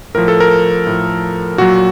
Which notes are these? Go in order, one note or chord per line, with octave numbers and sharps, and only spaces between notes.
A2 F3 A#4
A4
A#4
A2 F3
A#2 F#3 F#4